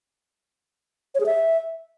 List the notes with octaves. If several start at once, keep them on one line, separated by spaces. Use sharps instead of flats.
C#5
G#4
E5